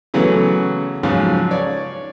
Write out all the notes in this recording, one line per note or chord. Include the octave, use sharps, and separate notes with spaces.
C#3 E3 F#3 A3 B3
G#2 C#3 F3 F#3
C#5 D5